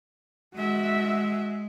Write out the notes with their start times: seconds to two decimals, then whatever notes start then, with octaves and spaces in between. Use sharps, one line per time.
0.55 G#3 F#4 E5